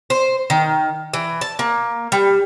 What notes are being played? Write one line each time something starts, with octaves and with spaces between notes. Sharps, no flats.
C5
D#3
E3
A5
A#3
G3